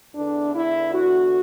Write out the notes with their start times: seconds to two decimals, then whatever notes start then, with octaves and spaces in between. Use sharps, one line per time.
0.15 E2 D3 D4
0.55 E4
0.94 F#4